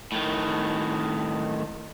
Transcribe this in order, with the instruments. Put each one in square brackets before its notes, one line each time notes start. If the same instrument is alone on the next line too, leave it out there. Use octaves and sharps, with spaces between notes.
[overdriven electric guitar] A2 D#3